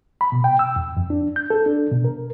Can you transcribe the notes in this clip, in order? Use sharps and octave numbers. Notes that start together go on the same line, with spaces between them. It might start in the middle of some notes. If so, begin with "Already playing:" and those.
B5
B2
G5
E6
E2
F2
D4
G6
A4
D4
B2
A#4